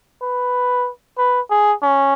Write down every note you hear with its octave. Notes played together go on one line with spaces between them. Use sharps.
B4
B4
G#4
C#4